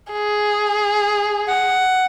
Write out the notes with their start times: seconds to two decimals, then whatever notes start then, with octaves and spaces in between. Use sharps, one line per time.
0.13 G#4
1.47 F#5